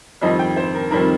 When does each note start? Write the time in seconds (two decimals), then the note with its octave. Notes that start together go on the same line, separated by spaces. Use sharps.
0.21 F2 D#3 G3 C4 D#5
0.39 G5
0.56 C5
0.75 A#4
0.91 F2 D#3 G3 C4 A#4